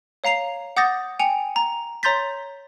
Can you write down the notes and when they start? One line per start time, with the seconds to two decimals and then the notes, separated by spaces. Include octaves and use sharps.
0.24 C#5 F5 A#5 C7 F7
0.77 F#5 D6 D#6 G6 A6 A#6
1.19 G5 G#5 C#7 F7
1.56 A#5
2.03 C#5 A#5 C6 G6 A6 B6